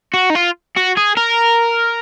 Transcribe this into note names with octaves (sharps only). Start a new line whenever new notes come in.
F#4
D#4
F4
F#4
G#4
A#4